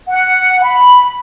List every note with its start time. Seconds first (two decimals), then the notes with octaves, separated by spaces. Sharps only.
0.09 F#5
0.63 B5